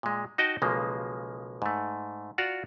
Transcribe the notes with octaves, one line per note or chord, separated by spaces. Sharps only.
A#2 G#3
D#4 F#4 D#5 G5 A5
B1 C#3 F3 G#3 A#3
G#2 A3
F4 F#4 D5 F#5 A#5